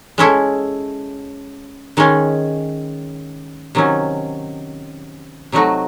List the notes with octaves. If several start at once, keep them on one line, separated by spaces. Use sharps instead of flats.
G#3 C#4 E4 A4
D#3 G#3 C#4
C3 D#3 F#3 C#4
C3 F#3 A3 D#4 F#4